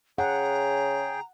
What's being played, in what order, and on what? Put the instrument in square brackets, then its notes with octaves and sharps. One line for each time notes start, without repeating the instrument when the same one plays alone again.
[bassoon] C#3 [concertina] G#4 G5 [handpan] F#5 [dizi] A#5